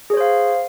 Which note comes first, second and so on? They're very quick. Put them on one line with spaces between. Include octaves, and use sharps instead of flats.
G#4 C#5 C5 F5